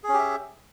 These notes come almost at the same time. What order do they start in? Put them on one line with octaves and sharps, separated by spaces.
G#4 C#4 G4 E5